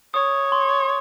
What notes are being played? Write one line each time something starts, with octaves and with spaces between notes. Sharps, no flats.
C#5 D#6
C6